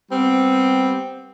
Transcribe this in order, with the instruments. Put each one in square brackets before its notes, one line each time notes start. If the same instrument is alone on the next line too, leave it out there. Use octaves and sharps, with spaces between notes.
[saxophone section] G3 B3 C4